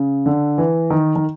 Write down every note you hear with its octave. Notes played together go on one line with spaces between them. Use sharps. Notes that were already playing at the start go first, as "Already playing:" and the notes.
Already playing: C#3
D3
E3
D#3
D#3